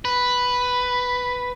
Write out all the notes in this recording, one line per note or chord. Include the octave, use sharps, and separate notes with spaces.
B4